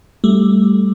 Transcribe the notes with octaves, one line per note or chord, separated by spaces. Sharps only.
G3 A3